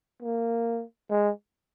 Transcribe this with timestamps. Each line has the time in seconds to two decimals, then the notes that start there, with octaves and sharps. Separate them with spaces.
0.22 A#3
1.10 G#3